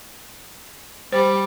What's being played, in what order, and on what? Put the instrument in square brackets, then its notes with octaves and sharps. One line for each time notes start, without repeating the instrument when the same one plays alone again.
[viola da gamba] G3 [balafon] C5